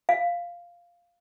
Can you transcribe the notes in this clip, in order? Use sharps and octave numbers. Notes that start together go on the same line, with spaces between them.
F5